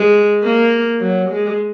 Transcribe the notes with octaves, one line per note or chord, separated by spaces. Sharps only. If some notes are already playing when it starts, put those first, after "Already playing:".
Already playing: G#3
A#3
F#3
G#3